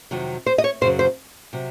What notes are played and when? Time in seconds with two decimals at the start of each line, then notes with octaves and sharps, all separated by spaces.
0.11 F2 C3 D#3 F#3
0.46 C5
0.58 D#5
0.64 C#5
0.81 F#2 C#3 F#3 C5
0.99 C5
1.53 C3 F#3